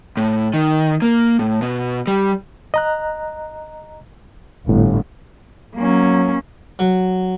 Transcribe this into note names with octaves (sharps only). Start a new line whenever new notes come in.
A2
D#3
A#3
A2
B2
G3
D#5 A#5 F#6
G1 A2
F#3 A#3 C#4
F#3